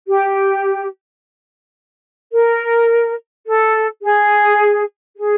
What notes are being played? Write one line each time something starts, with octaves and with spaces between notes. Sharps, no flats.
G4
A#4
A4
G#4
G#4